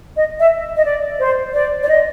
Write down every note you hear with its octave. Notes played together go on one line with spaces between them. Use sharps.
D#5
E5
D#5
D5
C5
D5
D5
D#5